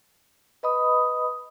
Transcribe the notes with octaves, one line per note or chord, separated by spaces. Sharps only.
B4 D#5 B5 D#6